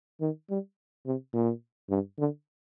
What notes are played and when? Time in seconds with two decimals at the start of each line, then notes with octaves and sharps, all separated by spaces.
0.21 D#3
0.50 G3
1.06 C3
1.33 A#2
1.90 G2
2.19 D3